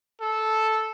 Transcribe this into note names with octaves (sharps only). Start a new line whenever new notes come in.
A4